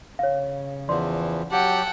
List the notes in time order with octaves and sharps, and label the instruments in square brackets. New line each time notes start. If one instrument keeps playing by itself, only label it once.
[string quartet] C#3 [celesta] C#5 F5
[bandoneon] E2 E3 F3 [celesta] D5 C6
[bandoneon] F#3 G4 [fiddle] F#5 [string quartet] G5 A5